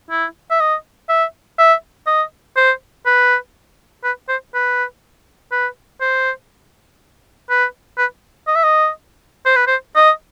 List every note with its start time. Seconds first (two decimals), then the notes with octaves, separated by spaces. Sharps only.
0.11 E4
0.51 E5
0.60 D#5
1.09 E5
1.59 E5
2.07 D#5
2.56 C5
3.06 B4
4.04 B4
4.28 C5
4.54 B4
5.52 B4
6.01 C5
7.50 B4
7.98 B4
8.47 D#5
8.56 E5
8.63 D#5
9.46 C5
9.56 B4
9.67 C5
9.95 D#5